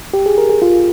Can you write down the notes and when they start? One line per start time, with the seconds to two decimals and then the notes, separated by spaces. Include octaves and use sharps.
0.13 G4
0.26 G#4
0.38 A#4
0.49 G#4
0.62 F4